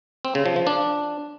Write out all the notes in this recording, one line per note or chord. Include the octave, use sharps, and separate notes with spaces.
C4
C#3
F3
F3
D4